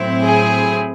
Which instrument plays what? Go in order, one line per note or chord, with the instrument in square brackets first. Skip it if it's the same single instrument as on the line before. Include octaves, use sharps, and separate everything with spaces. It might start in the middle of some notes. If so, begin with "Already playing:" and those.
Already playing: [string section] A2 F#3 C4 E4
G#4